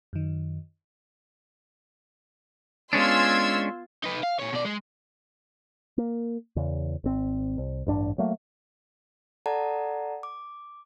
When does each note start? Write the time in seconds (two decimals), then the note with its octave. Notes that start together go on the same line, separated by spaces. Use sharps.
0.13 F#2 D#3
2.93 G#3 B3 C#4 D4 F4 C6 E6 G#6
4.04 D#4 B4
4.23 F5
4.40 A#2 C#5
4.53 B2 D5
4.65 G#3
5.98 A#3
6.56 E2 C#3
7.04 G#1 C4
7.58 C2
7.87 A1 G2 D4
8.18 F#3 A3 A#3
9.46 A4 D5 F#5 A5 A#5
10.23 D6